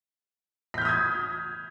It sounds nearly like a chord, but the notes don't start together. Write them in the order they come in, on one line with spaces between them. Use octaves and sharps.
B6 G6 F6 D#6 G#6